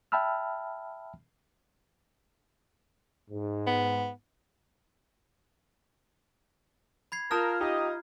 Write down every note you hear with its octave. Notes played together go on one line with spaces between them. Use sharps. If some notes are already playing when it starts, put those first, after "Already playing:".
E5 G5 A5 B5 E6 F6
G#2
B3
B5 G#6 C7
F4 A#4 A5 A#5 D#6 F6 G6
D#4 G4 D#5